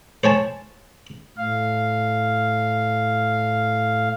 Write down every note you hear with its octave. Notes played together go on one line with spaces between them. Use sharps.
C5 C#5 G#5 A5
A2 F5